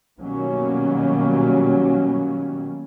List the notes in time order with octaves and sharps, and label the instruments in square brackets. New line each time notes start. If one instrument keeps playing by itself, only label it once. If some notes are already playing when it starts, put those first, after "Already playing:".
[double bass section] B2 D#3 F#3 G3 A#3 C#4